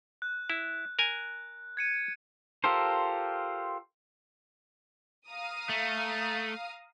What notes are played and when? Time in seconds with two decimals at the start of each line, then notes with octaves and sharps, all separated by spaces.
0.22 F#6
0.50 E4
0.99 A#4 G#5
1.77 G#6 C#7 D#7
2.64 F4 G4 A4 A#4 C5
5.28 F5 A#5 D#6
5.69 A3